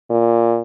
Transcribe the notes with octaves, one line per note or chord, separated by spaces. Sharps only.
A#2